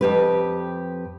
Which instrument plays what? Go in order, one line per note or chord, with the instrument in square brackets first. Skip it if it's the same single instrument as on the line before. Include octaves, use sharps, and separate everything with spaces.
[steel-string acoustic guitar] F2 G4 B4